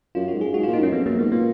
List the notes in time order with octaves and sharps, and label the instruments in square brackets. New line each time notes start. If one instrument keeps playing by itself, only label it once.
[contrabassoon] F#2 [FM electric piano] F4
[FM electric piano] F#4
[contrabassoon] G#2
[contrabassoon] F#2 [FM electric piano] G#4
[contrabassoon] G#2 [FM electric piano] F#4
[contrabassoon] A#2 [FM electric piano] F4
[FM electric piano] D#4
[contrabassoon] F#2 [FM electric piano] C#4
[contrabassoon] F2 [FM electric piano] B3
[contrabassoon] F#2 [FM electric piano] A#3
[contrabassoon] G#2 [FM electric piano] B3
[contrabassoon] A#2 [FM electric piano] B3